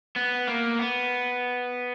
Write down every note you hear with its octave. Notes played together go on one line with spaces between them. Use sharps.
B3
A#3
B3